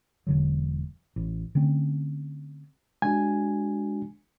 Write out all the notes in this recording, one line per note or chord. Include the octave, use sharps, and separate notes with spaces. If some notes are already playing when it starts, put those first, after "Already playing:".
E1 D3 F#3
A1
D3 A3 C4 C#4
G#3 D4 F#4 G#5